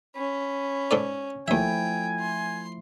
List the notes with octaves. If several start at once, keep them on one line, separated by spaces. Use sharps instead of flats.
C#4 B5
G#2 A4 D5
D#2 F3 A3 E4 E5 G5 G#5
C6